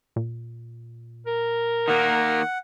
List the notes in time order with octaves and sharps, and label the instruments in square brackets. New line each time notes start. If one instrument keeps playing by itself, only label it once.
[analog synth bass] A#2
[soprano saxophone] A#4
[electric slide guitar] D#3 A#3 [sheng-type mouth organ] F#5